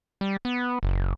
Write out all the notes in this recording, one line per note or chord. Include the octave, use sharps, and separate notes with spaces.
G3
B3
F#1